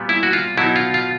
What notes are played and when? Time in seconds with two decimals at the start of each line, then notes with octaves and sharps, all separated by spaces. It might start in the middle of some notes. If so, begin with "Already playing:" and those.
Already playing: A#2 G3 B3
0.09 E4
0.23 F#4
0.33 F4
0.57 B2 F#3 B3 D#4 E4
0.76 F4
0.94 F4